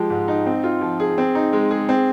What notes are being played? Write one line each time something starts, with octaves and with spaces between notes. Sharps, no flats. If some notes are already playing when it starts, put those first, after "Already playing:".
Already playing: F3 G#3 G4
G#2
D#4
C4
F4
F3
G#4
C4
D#4
G#3
G#4
C4